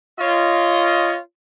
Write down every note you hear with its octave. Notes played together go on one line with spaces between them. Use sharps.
F4 C#5 D#5